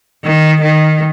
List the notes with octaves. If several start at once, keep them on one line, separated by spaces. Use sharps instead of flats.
D#3
D#3